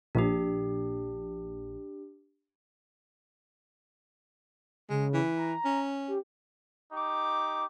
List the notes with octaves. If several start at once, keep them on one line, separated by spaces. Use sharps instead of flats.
A#1 D4 G4
C#3 G#3
E3
A#5
C#4
G4
D#4 G4 D6